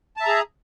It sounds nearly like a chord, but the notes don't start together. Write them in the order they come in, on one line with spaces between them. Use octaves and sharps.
A5 E5 A#5 G#4